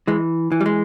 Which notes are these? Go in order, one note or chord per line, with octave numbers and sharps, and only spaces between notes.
E3 G#3
E3
G3
G#3